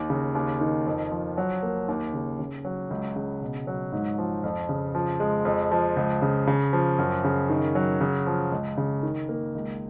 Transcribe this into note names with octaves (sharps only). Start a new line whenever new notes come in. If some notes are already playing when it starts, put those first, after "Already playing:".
Already playing: D#2
C#3
D#2
D#3
F2
F3
F#3
A#3
D#2
C#3
C#3
F#3
C#2
C#3
B2
F#3
G#2
F3
F2
C#3
F3
G#3
F2
F3
C#2
C#3
C#3
F3
F#2
C#3
D#3
F#3
C#3
F3
C#2
C#3
D#3
A#3
C#2